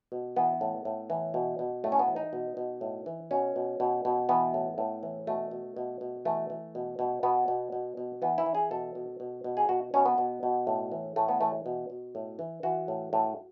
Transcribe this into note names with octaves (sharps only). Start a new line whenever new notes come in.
B2
E3 B3
A2
A2
E3
B2
B2
A2 A3
C#4
B3
E3
D#4
B2
B2
A2
E3
B2 C#4
B2
B2
B2
E3 B3
A2
A2
E3
B2 A3
B2
B2
B2
E3 A3
E3
B2
B2
B2 B3
B2
B2
B2
E3 B3
E4
E3
G#4
B2 A4
B2
B2
B2
G#4
B2 F#4
B2 C#4
B3
B2
B2
A2
E3
A2 A3
B3
E3 A3
B2
B2
A2
E3
E3 F#4
A2
A2